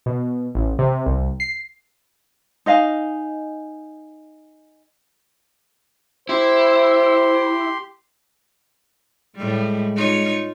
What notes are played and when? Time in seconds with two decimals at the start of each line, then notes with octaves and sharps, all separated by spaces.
0.06 B2
0.55 A1
0.79 C3
1.06 C2
1.40 C7
2.66 D#4 D#5 F5 G#5
6.29 E4 G4 C5 C6
9.36 A2 G3 G#3
9.96 D#4 F4 C#5